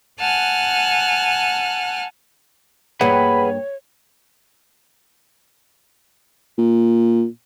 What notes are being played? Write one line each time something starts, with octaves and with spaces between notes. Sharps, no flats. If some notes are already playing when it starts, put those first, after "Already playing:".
F#5 G#5 A5 F6 F#6
G2 A#3 G#4 B4 C#5 F#5 B5
A#2